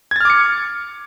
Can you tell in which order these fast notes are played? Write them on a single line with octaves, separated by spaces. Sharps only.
G#6 A6 F6 D6 C#7